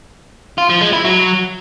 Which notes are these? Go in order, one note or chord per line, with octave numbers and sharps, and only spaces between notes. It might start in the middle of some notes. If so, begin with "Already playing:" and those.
F4
F3
G#3
E4
F#3